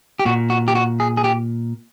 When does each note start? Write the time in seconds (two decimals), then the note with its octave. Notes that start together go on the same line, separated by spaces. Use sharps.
0.19 G4
0.25 A#2 F#4
0.50 F#4
0.68 G4
0.75 F#4
1.00 G#4
1.17 G#4
1.24 G4